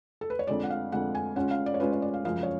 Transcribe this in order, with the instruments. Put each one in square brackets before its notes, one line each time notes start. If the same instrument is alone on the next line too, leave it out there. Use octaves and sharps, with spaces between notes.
[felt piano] A4
B4
C#5
F2 D3 G#3 D5
F#5
F5
F2 D3 G#3 F#5
G#5
C#3 G#3 C#4 F4 F#5
F5
D5
C#5
C#3 G#3 C#4 F4 B4
C#5
D5
F5
F#2 C#3 F3 G#3 F5
C#5